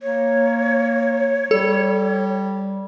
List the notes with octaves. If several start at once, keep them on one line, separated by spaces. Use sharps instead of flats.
A#3 C#5
G3 A4